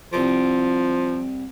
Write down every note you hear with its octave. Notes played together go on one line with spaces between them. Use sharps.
C2 F3 D6